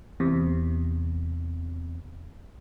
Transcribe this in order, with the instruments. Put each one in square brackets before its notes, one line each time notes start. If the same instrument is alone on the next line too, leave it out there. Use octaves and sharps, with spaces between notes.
[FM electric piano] E2 C3